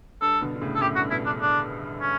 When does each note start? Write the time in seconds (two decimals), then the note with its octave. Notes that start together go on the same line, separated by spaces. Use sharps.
0.22 G2 A4
0.41 B2 D3
0.56 D3
0.61 A2 C#3
0.76 A4
0.81 F#2 A2 G4
0.96 G2 F#4
1.11 G2 B2 E4
1.26 D4
1.41 D4
2.01 C#4